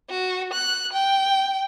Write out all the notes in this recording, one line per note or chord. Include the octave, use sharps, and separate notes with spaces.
F#4
F#6
G5